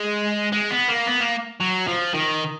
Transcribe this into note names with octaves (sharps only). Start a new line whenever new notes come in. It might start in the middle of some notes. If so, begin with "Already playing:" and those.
Already playing: G#3
G#3
B3
A#3
B3
A#3
F#3
F3
D#3